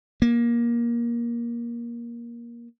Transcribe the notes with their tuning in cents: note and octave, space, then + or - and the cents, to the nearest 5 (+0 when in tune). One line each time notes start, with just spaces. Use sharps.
A#3 +20